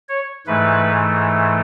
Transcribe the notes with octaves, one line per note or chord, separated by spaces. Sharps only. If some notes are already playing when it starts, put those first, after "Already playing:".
C#5
G#2 E3 A3 B4